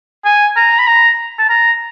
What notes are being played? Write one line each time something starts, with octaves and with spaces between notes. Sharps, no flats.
G#5
A#5
B5
A#5
A5
A#5